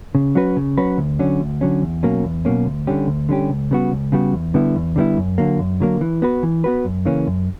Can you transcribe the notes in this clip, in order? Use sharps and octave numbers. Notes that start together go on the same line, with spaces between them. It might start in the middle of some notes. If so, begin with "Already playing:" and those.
C#3
F#3 C#4 F#4 B4
C#3
F#3 C#4 F#4 B4
D2
D3 F#3 C#4
D2
D3 F#3 C#4
E2
B2 F#3 A#3 C#4
E2
B2 F#3 A#3 C#4
D2
D3 G3 C#4 G4
D2
D3 G3 C#4 G4
C#2
C#3 G3 B3 F#4
C#2
C#3 G3 B3 F#4
E2
D3 G3 B3 E4
E2
D3 G3 B3 E4
F#2
D3 F#3 A#3
F#2
D3 F#3 A#3
E3
B3 F#4 B4
E3
B3 F#4 B4
F#2
C#3 E3 A#3 C#4
F#2